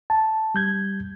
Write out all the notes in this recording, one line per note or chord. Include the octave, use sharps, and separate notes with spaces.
A5
G3 G6 G#6